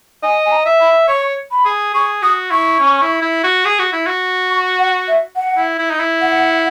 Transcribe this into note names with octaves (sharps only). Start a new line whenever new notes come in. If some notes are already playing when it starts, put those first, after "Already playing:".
D#5 G#5
G#5
A#5
E5
B5
C#5 C#6
B5
G#4
G#4 C#6
F#4 D#6
E4 C#6
C#4
E4
E4
F#4
G#4
F#4
E4
F#4
C#6
F#5
E5
F#5
E4
E4
D#4
E4
F#5